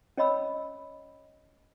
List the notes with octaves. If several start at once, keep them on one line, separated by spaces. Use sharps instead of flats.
C#4 C#5 D#5 B5 E6